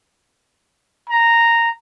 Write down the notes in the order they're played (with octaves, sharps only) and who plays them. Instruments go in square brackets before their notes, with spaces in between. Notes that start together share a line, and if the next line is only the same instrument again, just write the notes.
[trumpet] A#5